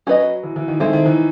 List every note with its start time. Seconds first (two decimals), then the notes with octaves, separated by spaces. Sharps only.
0.07 F#3 C#4 F#4 B4 D#5
0.43 E3
0.56 E3
0.68 D#3
0.80 D#3 G#3 C4 E4 A4 C5
0.93 D#3
1.06 E3